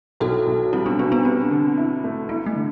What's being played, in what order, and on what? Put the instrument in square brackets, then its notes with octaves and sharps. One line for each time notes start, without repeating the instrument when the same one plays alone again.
[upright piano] B1 [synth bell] F#4 A4
[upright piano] B1
[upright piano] G3 [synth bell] C4 E4
[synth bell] B3 D4
[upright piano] B2 [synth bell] B3 D4
[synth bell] B3 D4
[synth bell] C4 [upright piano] G4
[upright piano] D3
E4
A3
[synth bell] B3 [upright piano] E4
[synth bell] A3
[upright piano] D3